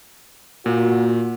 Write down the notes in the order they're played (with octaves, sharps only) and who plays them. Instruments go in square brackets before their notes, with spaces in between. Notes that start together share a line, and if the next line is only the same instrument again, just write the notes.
[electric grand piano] A#2 [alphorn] F#4